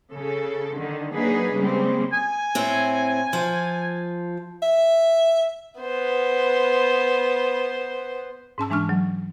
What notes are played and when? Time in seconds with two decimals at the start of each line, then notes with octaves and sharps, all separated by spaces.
0.12 C#3 A4
0.76 D3 D#3
1.14 F#3 A#3 D4 D#4 G#4 B4
1.53 C#3 G3 G#3 A#3 C4
2.13 G#5
2.55 A2 C4
3.33 F3
4.62 E5
5.80 B3 C5
8.58 G#2 C#4 A5 E6
8.70 E3 G#3 D4 C#6 F6
8.89 F#3